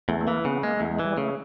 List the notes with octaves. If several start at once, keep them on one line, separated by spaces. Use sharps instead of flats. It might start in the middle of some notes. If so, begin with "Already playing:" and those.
E2 A3
A3
E3 A#3
C#3 B3
G#3 A#3
E2 A3
G#3
E3
G3
C#3 A3